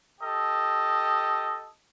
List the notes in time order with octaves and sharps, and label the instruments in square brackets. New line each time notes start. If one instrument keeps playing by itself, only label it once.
[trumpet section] G4 A4 D#5